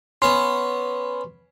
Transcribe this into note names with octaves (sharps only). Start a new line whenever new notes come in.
B3 C#4 C6